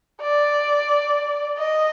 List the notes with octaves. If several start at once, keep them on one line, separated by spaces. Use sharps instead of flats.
D5
D#5